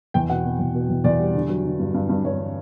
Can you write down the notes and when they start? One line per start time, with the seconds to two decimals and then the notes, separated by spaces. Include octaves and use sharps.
0.14 E2 G5
0.30 B2 F#5
0.44 B2
0.59 E2
0.74 B2
0.89 E2
1.04 E2 D5
1.20 G3
1.35 D3
1.49 F#3
1.64 D3
1.79 G2
1.94 G2
2.09 G2
2.24 G2 C#5